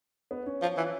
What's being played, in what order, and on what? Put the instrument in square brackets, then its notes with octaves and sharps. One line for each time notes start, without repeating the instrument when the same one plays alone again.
[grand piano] B3
C#4
[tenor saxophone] F3
E3